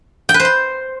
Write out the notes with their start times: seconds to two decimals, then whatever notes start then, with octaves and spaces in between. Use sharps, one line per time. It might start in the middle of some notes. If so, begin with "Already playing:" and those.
0.29 G5
0.34 B4
0.40 C5
0.45 C6